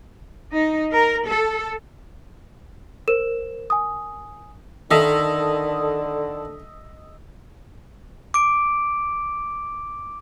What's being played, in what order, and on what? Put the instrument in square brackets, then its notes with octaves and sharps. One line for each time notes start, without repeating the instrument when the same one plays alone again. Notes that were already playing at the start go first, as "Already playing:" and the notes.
[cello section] D#4
A#4
A4
[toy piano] A#4 [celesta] C5 E7
[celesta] G#5 D#6
[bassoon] D3 [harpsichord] D#3 [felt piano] A4 [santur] D#5 E5
[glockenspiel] D6 D7